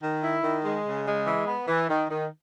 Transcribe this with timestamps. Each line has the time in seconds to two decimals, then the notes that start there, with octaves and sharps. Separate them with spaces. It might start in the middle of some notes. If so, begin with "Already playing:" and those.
0.03 D#3
0.24 E4
0.44 D#3
0.65 G#3
0.86 C#3
1.06 G#3
1.27 E3
1.47 B3
1.68 E3
1.90 D#3
2.10 D#3